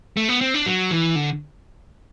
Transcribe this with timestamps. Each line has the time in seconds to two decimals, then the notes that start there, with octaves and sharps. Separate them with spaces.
0.17 A3
0.29 B3
0.41 C4
0.54 D4
0.66 F#3
0.91 E3
1.16 D3